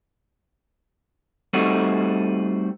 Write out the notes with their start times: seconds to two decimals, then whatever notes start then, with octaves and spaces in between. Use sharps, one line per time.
1.53 G3 A3 C4 D#4 F#4